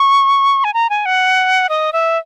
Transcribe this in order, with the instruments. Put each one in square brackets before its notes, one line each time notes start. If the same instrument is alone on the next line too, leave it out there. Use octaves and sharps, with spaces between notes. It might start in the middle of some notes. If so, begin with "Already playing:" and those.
Already playing: [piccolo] C#6
G#5
A#5
G#5
F#5
D#5
E5